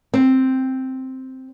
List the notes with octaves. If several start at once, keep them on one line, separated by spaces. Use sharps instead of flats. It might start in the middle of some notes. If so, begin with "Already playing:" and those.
C4